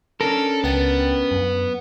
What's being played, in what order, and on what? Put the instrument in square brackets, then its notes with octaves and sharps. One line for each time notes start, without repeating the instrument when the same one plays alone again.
[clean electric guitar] C#4 D4 A#4 [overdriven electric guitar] A4
[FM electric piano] C#2 G5 A6 [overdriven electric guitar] B3
[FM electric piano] F#2